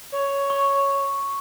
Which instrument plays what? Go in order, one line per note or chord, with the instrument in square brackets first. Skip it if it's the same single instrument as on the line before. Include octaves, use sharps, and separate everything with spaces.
[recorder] C#5
[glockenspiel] C#6